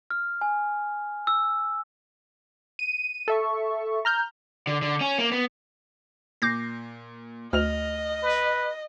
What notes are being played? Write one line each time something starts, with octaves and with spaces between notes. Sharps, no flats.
F6
G#5
E6
D#7
A4 E5 C#6
A#5 F6 G6
D3
D3
C#4
A#3
B3
A#2 D6 G6 A#6 C7
D2 D#5 F6 F7
B4